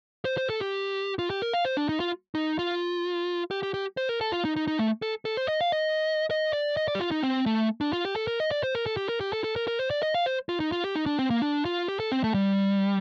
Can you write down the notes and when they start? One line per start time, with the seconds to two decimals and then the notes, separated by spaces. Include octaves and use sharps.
0.25 C5
0.38 C5
0.50 A4
0.60 G4
1.19 F4
1.30 G4
1.42 A#4
1.53 F5
1.65 C5
1.77 D4
1.89 D#4
2.00 F4
2.35 D#4
2.59 F4
3.51 G4
3.63 G4
3.74 G4
3.97 C5
4.09 A#4
4.21 A4
4.32 F4
4.45 D#4
4.56 D#4
4.67 D#4
4.79 A3
5.02 A4
5.25 A4
5.37 C5
5.48 D#5
5.61 F5
5.72 D#5
6.31 D#5
6.53 D5
6.77 D#5
6.88 D5
6.95 G4
7.00 F4
7.11 D#4
7.23 C4
7.46 A3
7.81 D4
7.93 F4
8.05 G4
8.16 A4
8.27 A#4
8.40 D#5
8.51 D5
8.63 C5
8.75 A#4
8.86 A4
8.97 G4
9.09 A#4
9.21 G4
9.33 A4
9.44 A4
9.56 A#4
9.68 A#4
9.79 C5
9.90 D5
10.03 D#5
10.14 F5
10.26 C5
10.49 F4
10.60 D#4
10.72 F4
10.84 G4
10.95 D#4
11.06 D4
11.19 C4
11.30 A#3
11.42 D4
11.65 F4
11.88 G4
12.00 A4
12.11 C4
12.24 A3
12.34 G3